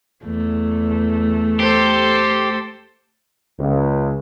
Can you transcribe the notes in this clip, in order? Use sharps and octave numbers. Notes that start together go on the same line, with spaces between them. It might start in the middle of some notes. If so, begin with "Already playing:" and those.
E2 A3
G4 A4 C5
C#2